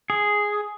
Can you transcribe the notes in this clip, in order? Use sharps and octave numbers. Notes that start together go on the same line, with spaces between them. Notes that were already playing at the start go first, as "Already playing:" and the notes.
G#4